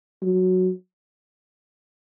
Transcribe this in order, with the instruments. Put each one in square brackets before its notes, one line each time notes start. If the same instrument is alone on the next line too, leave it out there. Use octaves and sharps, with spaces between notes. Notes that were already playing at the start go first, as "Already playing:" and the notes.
[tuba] F#3